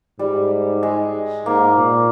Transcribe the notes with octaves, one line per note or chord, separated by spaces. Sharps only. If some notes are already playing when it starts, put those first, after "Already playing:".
G#2 G3
G#3
G#2 A#3
A#2